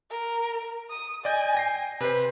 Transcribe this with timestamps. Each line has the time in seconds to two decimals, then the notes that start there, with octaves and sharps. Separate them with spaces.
0.11 A#4
0.90 D#6
1.25 D5 D#5 G#5 G6
1.55 G5 A#6 C7
2.00 C3 B4 C5